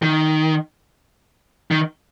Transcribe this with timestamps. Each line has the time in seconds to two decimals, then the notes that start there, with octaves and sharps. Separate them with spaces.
0.02 D#3
1.71 D#3